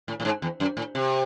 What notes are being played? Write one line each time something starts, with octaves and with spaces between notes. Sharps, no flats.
A2
A2
G#2
E2
F#2
A2
C3